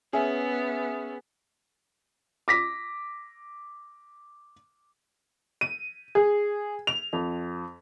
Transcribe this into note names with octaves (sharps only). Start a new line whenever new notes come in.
B3 C#4 G#4 E5
D6 A#6 B6
D#7
G#4
F7
F2